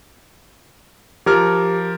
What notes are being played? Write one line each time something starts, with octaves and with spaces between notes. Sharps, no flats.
F3 G4 A#4 F6